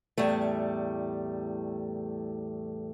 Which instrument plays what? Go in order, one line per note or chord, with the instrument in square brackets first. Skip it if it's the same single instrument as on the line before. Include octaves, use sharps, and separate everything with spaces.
[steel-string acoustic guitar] E2 A2 G3 A3